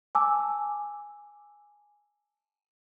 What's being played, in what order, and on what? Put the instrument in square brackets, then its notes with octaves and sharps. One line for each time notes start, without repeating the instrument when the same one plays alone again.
[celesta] G#5 A5 D6 E6